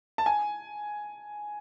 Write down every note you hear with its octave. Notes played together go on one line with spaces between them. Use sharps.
A5
G#5